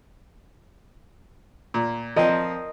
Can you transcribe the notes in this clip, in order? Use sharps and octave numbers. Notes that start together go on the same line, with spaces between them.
A#2
F3 C4 A#4 D#5 A#5